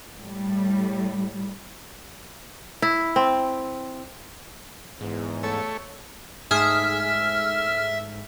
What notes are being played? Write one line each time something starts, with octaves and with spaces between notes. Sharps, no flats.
A2 G3
E4
C4
E2 G#2
A3 A4 C#5
G#2 A3 G#4 E5 F6